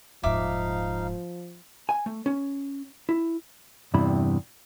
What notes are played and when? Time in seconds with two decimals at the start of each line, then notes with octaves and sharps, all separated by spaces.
0.23 D#1 G#2 F3 D#4 E5 F5 D6
1.89 G#5
2.06 A3
2.26 C#4
3.09 E4
3.94 E2 G2 C3 E4 B5